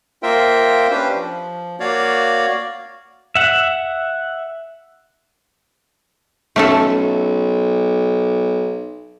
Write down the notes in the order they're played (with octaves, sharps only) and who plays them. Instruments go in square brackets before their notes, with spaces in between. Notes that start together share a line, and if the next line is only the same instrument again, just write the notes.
[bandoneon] A#3 F4 A#4 C5 E5 G5
C#4 D4 G4 B4 C5
F3
A#3 F#4 C#5 D5 F5
[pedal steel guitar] E5 F#5
[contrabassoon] B1 [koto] A3 C#4 A4